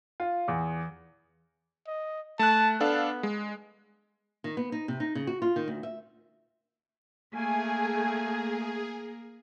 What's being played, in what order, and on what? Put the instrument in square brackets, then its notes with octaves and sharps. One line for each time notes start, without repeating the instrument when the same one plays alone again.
[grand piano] F4
E2
[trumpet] D#5
[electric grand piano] A3 F#6 [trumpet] A5
[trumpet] B3 [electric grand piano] D4 A4 F5
[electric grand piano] G#3
[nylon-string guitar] D#3
B3
D#4
C3
D#4
C#3
F#4
F4
D#3
D2
E5
[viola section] A3 G#5 [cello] A#3 [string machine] G#4